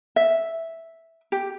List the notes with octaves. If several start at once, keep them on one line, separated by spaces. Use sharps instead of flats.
E5
G4